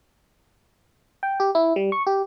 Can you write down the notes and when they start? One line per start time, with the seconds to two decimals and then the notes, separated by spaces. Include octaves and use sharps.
1.23 G5
1.40 G4
1.55 E4
1.76 G3
1.92 C#6
2.07 G4